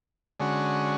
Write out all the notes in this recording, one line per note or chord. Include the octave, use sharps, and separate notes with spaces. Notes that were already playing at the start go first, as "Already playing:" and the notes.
D3 G#3 C#4 F#4